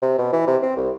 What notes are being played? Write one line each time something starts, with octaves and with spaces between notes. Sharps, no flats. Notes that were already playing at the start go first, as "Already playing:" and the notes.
C3
B2
E3
C3
C4
C2